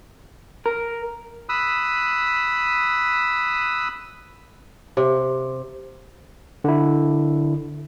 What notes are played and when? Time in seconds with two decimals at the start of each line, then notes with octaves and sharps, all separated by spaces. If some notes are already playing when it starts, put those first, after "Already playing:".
0.66 A#4
1.49 B5 D#6 E6 F#6
4.97 C3
6.64 D3 E4